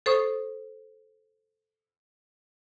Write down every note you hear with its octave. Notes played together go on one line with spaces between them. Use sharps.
A4 C5 C#6 D#6